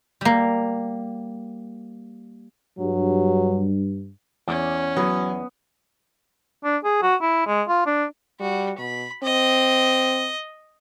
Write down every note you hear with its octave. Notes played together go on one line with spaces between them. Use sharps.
G3 A#3
G2 F#3
E2 C#4
F#3 B3
D4
G#4
F#4
E4
G#3
F4
D4
G3 F#4
B2 B5
C4 D#5